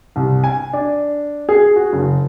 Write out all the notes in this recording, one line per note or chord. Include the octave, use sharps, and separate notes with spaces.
C2
G#5
D4
G#4
F#4
F#1